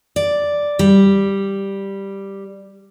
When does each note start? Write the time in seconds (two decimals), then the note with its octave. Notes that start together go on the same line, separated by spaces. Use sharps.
0.16 D5
0.79 G3